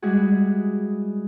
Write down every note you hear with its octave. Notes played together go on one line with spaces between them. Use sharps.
G3 G#3 E4 F#4 G#4